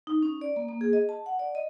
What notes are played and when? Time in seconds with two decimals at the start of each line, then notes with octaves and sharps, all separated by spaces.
0.07 D#4
0.23 C#4
0.41 D5
0.56 A#3
0.69 A#3
0.81 G#4
0.93 D#5
1.09 A5
1.26 F#5
1.39 D5
1.55 D#5